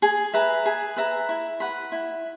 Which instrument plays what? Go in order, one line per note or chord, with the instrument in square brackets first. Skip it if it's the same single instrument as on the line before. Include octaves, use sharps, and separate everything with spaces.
[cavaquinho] G#4
B4 E5 A#5
G#4
B4 E5 A#5
E4
B4 F#5 B5
E4